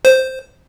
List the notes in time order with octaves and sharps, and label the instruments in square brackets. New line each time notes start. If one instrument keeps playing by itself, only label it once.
[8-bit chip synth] C5